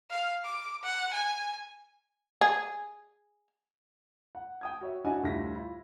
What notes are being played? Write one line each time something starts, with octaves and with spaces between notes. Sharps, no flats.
F5
D6
F#5
G#5
G#4
F#5
G5 D#6 G#6
F#4 C#5 E5
D4 E4 F#4 D#5 F#5 G#5
D2 A2 G3 F4 A#6 B6
E4 F4